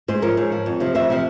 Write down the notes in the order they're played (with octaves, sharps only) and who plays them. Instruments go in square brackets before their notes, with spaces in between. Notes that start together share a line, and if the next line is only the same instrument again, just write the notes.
[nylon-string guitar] G#2 G#4 C5
F3 A#4 C#5
G#2
F3
F2
C3 F3
F2 C5 E5
C3 F3